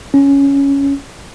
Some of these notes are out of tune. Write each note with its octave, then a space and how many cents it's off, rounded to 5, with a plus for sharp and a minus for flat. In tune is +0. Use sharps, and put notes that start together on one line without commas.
C#4 +5